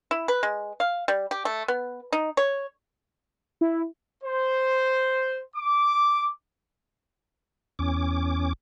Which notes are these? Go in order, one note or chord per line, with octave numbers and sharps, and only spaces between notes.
E4
B4
G#3
F5
G3
G4
A3
B3
D#4
C#5
E4
C5
D6
E2 C#4 D6